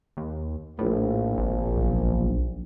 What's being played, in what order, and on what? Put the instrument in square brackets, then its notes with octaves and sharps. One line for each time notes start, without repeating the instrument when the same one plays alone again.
[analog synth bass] D#2
[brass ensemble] A#1 [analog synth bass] A2
[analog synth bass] G#1
[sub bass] B1